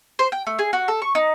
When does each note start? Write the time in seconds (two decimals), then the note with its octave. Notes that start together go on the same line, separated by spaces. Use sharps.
0.19 C5
0.32 G5
0.47 A3
0.59 G#4
0.73 F#4
0.88 A4
1.02 C#6
1.15 D#4